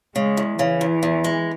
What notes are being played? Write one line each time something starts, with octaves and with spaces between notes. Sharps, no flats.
C#3 G#3
E2
C#3 E3
E2
E2
G#3